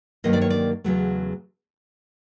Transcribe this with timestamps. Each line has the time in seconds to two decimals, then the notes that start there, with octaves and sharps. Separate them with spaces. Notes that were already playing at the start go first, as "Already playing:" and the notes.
0.24 G2 D#3 F#3 A#3 D#5
0.33 D5
0.41 C#5
0.50 D5
0.84 E2 C#3 F#3 A3